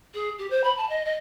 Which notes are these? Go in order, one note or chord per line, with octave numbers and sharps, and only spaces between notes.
G#4
G4
C5
B5
A5
D#5
D#5